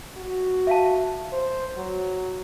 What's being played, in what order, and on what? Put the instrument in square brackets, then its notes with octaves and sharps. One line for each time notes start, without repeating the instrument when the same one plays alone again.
[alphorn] F#4
[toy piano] E5 F5 A5
[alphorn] C5
F#3